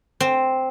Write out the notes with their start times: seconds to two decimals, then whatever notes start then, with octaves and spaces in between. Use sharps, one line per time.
0.20 C4